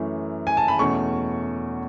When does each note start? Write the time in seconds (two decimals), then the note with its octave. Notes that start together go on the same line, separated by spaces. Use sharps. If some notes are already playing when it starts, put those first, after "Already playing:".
Already playing: F#2 E3 A3 C#4
0.47 G#5
0.57 A5
0.68 B5
0.79 E2 B2 A3 C#4 C#6